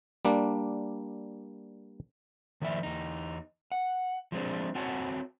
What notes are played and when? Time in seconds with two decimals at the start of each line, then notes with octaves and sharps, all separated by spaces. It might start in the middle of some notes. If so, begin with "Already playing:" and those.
0.25 G3 A#3 D4
2.62 D#3 F3 D5 E5
2.83 E2 D#4
3.72 F#5
4.32 F3 G#3 C4 D4
4.75 C4 F#4 C#5 F#5 G#5 A5